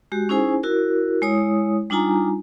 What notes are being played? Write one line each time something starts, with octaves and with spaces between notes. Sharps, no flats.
G#3 F#4 G4
C#4 D#4 E4 G#4 C5 G#5
E4 F#4 A#4
G#3 E4 C#5 D#6
G3 D4 D#4 F4 G#5 A#5